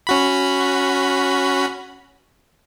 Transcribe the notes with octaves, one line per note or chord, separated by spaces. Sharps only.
C#4 F#4 B5